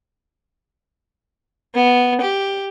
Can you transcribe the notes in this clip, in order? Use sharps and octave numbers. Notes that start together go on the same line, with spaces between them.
B3
G4